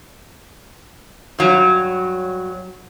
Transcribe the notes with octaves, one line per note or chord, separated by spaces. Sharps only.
G2 F#3